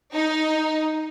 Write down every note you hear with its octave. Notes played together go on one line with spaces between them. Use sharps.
D#4